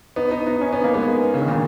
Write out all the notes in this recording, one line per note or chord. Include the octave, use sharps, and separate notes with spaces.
B3 D#4
B3 D#4
B3 D#4
C#4
B3
A#3
G#3 B3
C#3
D#3
A#2 C#3